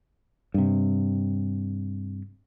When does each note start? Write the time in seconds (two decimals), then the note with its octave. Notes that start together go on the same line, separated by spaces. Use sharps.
0.54 G2 C3